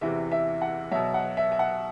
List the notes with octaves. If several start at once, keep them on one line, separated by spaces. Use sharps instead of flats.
E2 C3 E3 E5
E5
F#5
B2 F#3 E5
F#5
E5
E5
F#5